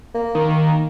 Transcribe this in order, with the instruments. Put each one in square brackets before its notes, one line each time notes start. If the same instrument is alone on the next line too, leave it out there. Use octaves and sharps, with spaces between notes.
[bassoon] A#3
[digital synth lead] D#3